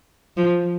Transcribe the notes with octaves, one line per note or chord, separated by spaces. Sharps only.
F3